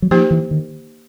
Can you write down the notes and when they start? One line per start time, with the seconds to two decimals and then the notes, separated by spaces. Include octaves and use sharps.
0.02 F#3
0.11 F3 A#3 D#4 G4 C5
0.31 E3
0.51 D#3